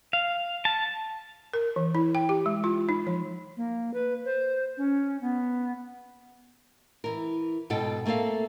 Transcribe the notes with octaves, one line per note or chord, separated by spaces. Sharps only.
F5
A5
A#4
E3
E4
G5
G4
G#3
F4
D#4
F3
A#3
B4
C5
C#4
B3
E3 A#4
G#2 B2 A4 G5
A3 A#3 C4 A4 F5